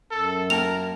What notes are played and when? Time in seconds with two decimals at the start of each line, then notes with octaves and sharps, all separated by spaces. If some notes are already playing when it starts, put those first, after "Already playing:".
0.11 F#2 A4
0.50 A#3 A#4 G5 A5 F7